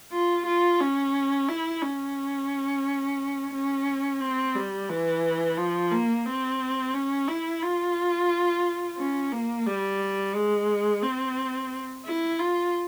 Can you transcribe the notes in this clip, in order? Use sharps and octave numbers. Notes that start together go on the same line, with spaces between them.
F4
F4
C#4
E4
C#4
C#4
C4
G3
E3
F3
A#3
C4
C#4
E4
F4
C#4
A#3
G3
G#3
C4
E4
F4